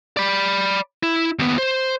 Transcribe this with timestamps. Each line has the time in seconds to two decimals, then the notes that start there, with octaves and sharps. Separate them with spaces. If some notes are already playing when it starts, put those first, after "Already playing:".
0.17 D5 B5
1.03 E4
1.39 D#2 B3
1.58 C5